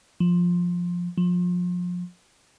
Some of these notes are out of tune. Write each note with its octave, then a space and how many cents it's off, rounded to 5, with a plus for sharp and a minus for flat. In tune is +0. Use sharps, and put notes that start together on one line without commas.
F3 +10
F3 +30